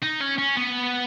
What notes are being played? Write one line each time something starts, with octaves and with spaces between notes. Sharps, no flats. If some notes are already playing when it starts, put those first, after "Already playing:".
D#4
C#4
C#4
B3